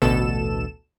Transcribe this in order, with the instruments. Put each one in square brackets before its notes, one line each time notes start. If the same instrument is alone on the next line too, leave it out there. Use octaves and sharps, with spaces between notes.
[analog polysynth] A1 D2 B2 A4 E7